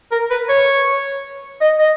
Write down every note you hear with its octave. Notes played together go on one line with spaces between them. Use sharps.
A#4
B4
C#5
D#5
D#5